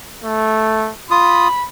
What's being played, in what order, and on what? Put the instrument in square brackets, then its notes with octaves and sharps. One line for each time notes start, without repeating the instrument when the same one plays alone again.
[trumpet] A3
[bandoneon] F4 D#6 [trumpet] B5